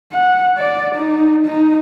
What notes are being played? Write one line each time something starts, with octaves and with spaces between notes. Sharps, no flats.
F#5
D5
D#4
D#4